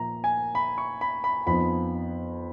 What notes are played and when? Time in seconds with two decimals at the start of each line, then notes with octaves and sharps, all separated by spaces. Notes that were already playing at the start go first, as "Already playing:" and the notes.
Already playing: A#2 F3 A#3 A#5
0.24 G#5
0.55 B5
0.78 C#6
1.01 B5
1.24 B5
1.46 F2 F3 B3 D#4 B5